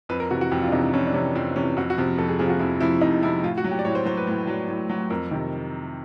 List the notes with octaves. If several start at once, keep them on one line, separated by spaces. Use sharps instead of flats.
F2 B4
A#4
C3 E3 F#4
F#4
F2 G4
F4
D4
C3 E3 D#4
D4
F2 C#4
D4
C3 E3 C#4
F2 C4
C3 E3 C#4
F2 F#4
F#4
C3 F3
F2 A4
G#4
C3 F3 G#4
F4
F#4
F2 E4
C3 F3 E4
F2 D#4
C3 F3 E4
A2 F4
F#4
F#3
G4
D5
A2 C#5
C5
F#3 C5
B4
A2
F#3
A2
F#3
F2 A#4
C3 D#3